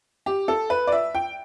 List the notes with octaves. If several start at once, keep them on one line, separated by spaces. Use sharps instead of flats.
G4
A4
B4
D5
E5
G5